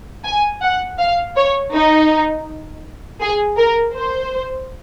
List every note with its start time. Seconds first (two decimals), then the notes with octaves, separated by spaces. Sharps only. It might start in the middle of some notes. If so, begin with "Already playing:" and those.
0.25 G#5
0.62 F#5
0.99 F5
1.36 C#5
1.73 D#4
3.21 G#4
3.58 A#4
3.95 C5